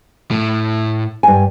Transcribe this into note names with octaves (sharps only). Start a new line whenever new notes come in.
A2
G2 G#5